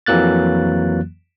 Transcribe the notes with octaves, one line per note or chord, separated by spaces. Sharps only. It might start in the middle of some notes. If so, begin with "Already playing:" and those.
F2 E3 F#3 A#3 F#6 A6